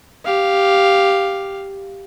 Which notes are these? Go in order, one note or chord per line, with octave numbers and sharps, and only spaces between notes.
G4 F5